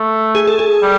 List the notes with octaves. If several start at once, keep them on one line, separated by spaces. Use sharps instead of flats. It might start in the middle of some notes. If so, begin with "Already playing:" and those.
Already playing: A3
G#4
A4
G#4
G3